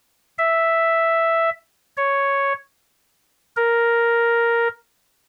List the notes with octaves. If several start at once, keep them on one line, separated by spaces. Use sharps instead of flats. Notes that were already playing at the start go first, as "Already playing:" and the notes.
E5
C#5
A#4